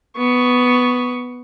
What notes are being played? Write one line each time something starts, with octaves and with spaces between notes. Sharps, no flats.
B3 C#6